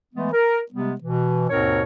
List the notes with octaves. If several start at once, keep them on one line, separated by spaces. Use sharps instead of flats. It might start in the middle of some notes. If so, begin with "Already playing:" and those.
E3 G#3 A3 B3
A#4
C3 G3 G#3 B3
B2 E3
D#2 G#2 B2 C4 A#4 C#5